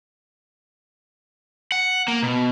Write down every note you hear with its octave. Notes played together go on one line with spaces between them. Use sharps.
F#5
A#3
B2